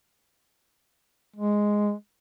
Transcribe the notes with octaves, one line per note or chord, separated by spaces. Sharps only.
G#3